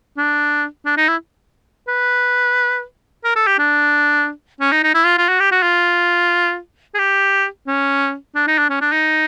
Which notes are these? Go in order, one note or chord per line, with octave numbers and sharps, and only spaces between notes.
D4
D4
D#4
E4
B4
A#4
A4
G4
D4
C#4
D#4
D#4
E4
F4
F4
F#4
G4
F#4
F4
G#4
G4
C#4
D4
D#4
D4
C#4
D4
D#4